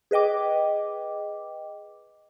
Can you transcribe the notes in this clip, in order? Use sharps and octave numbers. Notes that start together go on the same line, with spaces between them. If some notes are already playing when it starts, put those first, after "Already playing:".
G#4 B4 D#5 G5 D6